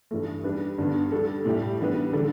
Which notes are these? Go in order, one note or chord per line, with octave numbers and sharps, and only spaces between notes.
G2 E3 A3
G3 D4 B4
G2 D3 B3 D4
G3 D4 A4
A2 G3 E4 G4
E3 G3 B3 D4 B4
D3 G3 D4 A4